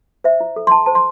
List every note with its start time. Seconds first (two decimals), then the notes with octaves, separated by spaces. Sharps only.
0.24 C5 E5
0.40 E4
0.56 A4
0.67 C6
0.71 E4 A5
0.86 C5 A5
0.95 C6